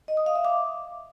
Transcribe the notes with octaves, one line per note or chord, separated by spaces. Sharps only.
D#5
D#6
F5
E5
D6